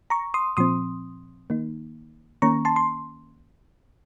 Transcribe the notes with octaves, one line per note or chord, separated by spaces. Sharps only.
A#5 C#6
C6 D#6
A#2 F3 C4 C6 D#6
D#3 A#3 D#4
D#3 A#3 C#4 A#5 C#6
A5 C6
C6